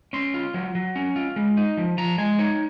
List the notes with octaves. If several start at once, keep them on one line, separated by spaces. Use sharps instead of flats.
C#4 C6
F4
F#3
F#3
C#4
F4
G#3
D#4
F3
F3 A#5
G#3 G#5
D#4 C#5